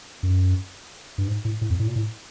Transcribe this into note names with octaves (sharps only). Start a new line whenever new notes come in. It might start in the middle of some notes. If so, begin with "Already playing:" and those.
F#2
G2
G#2
A2
A2
F2
A2
A#2
A2